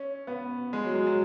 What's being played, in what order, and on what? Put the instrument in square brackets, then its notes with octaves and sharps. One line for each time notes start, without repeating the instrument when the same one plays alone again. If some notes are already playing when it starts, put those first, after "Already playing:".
Already playing: [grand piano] C#4
B3
G#3
F#3
G#3
F#3